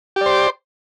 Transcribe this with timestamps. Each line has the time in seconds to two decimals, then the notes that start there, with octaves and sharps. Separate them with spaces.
0.16 G4
0.21 D5
0.26 C5